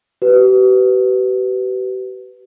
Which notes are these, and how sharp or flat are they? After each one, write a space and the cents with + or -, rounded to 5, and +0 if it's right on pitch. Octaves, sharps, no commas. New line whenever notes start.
G4 -45 B4 +10